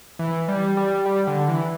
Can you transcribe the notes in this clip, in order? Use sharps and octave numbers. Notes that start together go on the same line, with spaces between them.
E3
G3
G3
G3
D3
E3